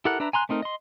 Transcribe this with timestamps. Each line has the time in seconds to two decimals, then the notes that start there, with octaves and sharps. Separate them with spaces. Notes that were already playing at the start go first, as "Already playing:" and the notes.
0.05 E4 G4 A4 A#4 F#5
0.20 D4 B4 E5 A#5
0.33 G#5 A#5 C6 F#6
0.49 A3 C4 D#4 A#4
0.62 D#5 C6